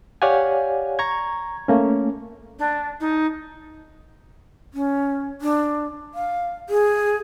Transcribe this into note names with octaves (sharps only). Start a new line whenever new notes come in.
G4 C#5 D5 F5 F#5 G#5
A#5 C#6 G#6
A3 A#3 C#4
D4
D#4
C#4
D4
F5
G#4